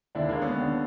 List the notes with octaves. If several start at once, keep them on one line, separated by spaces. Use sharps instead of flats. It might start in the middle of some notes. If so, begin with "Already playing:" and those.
D#2 D3 D4 E4
G#3 A#3
B3 C#4
D#2 D3